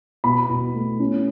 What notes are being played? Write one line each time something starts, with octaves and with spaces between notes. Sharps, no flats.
B2 B5
B2
A3
C#4